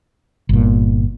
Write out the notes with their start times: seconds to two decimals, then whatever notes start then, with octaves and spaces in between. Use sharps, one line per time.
0.49 G1 A#2